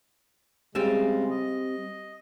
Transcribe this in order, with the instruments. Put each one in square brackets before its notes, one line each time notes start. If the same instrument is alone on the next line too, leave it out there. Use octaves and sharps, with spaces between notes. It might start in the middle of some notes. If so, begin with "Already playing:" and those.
[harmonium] C#3 G#3 [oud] G3 C4 E5
[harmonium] D#5